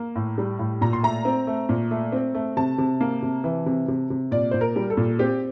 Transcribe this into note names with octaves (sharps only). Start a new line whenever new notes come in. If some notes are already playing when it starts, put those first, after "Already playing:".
Already playing: A#3
A2
G3
A2
A#2 A#5
C6
A3 A#5
C4
A3
A#2
A3
C4
A3
C3 A5
C3
A#3
C3
E3
C3
C3
C3
A#2 D5
A#2 C5
A#4
G3
A4
A#2
C4 G4